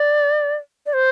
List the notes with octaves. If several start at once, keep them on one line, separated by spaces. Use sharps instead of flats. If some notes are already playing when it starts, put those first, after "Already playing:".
Already playing: D5
D5
C5